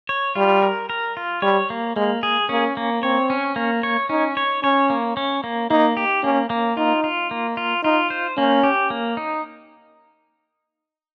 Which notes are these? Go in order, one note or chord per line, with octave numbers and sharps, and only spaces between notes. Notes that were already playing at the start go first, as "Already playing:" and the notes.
C#5
G3 F4
A#4
A#4
F4
G3 C#5
A#3
G#3 A#3
G#4
A#3 C#4
A#3
C4 C#5
C#4
A#3
C#5
C#4 D#4
C#5
C#4 C#5
A#3
C#4
A#3
A#3 D#4
G4
A#3 C#4
A#3
D#4 F4
F4
A#3
F4
D#4 F4
C5
A#3 C#4
G4
A#3
D#4